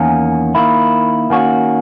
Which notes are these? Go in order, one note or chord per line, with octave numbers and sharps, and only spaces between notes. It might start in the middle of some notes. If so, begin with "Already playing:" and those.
Already playing: E2 D#3 A#3 C#4
D#3 A#3 E4
D#3 A#3 C#4 F#4